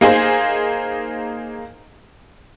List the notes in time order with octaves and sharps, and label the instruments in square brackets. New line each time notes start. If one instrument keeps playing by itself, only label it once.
[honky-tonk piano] A#3 D#4 G#4 C5